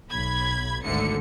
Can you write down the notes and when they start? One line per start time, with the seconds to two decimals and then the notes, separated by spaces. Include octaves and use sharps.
0.10 B1 B5 G#6
0.83 G#1 D2 D3 C#7